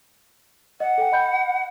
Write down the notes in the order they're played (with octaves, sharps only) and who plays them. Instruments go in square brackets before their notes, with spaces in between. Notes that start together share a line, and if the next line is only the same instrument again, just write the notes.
[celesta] D#5 [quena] F#5
[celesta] A4 G5
D#5 B5 G6